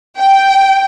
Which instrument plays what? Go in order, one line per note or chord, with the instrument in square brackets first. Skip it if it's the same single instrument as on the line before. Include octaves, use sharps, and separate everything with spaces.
[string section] G5